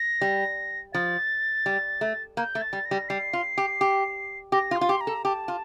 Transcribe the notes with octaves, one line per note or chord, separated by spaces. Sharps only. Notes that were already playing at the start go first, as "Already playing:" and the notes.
Already playing: A#6
G3
F3 A6
G3
A3
A#3 G6
A3
A6
G3
A#6
G3
G3 C7
F4
G4
G4
G4 A#6
F4
C6
F4
G4
A#5
A4
G4 A5
F4